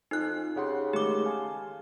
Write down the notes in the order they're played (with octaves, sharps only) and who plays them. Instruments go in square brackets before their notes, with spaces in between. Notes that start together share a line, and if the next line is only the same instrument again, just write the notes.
[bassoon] F2 [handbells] D#4 F#6
[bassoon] C#3 [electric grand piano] G4 F#5 C6
[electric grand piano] D#3 G#3 A3 [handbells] G4 D6
[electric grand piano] F5 G#5 A5